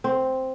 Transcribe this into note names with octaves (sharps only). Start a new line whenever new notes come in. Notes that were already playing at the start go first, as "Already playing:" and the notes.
C4